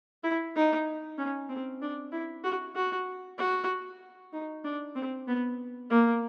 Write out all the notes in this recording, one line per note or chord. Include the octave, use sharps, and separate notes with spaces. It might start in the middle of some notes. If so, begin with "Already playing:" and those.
E4
D#4
C#4
C4
D4
E4
F#4
F#4
F#4
D#4
D4
C4
B3
A#3